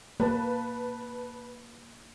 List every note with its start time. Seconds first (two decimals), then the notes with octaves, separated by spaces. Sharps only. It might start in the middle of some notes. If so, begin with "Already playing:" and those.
0.20 A#3 B4 A5